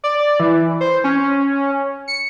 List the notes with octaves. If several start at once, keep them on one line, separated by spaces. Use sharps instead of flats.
D5
E3
C5
C#4
C#7